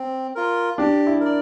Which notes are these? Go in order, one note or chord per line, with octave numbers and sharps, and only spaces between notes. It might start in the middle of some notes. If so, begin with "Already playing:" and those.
Already playing: C4
F4 A#4
D4 G4
E4
A#4 D5